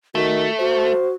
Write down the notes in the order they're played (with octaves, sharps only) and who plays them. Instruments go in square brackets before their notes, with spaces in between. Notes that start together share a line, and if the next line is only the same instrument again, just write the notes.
[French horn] D#3 [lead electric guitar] A3 [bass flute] F#4
[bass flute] F#4 [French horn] C5